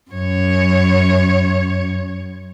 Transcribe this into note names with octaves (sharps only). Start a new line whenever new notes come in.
F#2 C#5